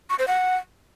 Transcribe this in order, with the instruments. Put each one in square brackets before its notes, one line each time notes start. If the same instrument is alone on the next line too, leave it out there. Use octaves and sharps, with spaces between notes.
[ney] C#6
C5
F#5